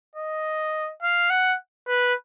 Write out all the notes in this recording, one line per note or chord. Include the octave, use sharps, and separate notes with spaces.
D#5
F5
F#5
B4